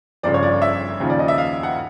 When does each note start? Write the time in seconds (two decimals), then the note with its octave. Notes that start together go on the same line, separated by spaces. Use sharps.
0.23 G1 F2 C#3 D5
0.34 C#5
0.43 D5
0.62 E5
1.00 D#2 C#3 F3
1.10 D5
1.19 D#5
1.28 E5
1.38 F5
1.63 F#5